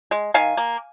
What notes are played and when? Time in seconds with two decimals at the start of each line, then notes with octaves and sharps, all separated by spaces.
0.11 G#3
0.34 D#3 F5 G#5
0.57 A#3